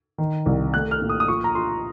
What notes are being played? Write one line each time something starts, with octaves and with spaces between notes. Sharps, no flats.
D#3
C2
A3 F#6
F6
A#2
D#6
D#6
F3 C#6
A#5
F3 C6